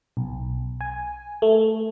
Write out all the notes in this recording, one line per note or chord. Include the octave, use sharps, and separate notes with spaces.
B1
G#5
A3